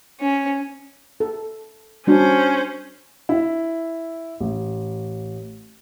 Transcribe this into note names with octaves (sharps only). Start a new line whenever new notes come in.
C#4
A4
G3 C#4 D4 F#4 C5
E4
A1